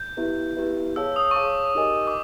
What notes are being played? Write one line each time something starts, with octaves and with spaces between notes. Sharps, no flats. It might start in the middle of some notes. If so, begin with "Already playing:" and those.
Already playing: G6
B3 E4 G4 B4 E5
B3 E4 G4 B4 E5
G#4 C#5 F5 A5 E6
D#6
C#6
G#4 C#5 F5 A5 D6
D#4 G4 A#4 D#5 G#5
D6